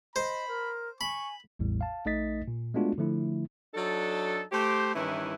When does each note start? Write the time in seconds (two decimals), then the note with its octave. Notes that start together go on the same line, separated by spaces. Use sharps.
0.16 C5 D#5 B5
0.48 A#4
1.01 G#5 B5 C#6
1.59 A1 E2 A2 G3
1.81 F5 A5
2.05 A#1 A3 D#4 D#5 A6 B6
2.48 A#2
2.74 G#3 A3 B3 D4 F4 F#4
2.98 D3 F3 A3 E4
3.74 F#3 D4 D#4 A4
4.52 A3 G4 C5
4.95 G2 D#3 E3 C#4 E4 B4